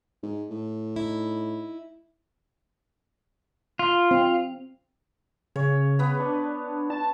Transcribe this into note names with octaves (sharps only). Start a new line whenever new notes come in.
G#2
A2
D#4 E4
F4
C4
C#3 C#5
B3 B4
D4
A5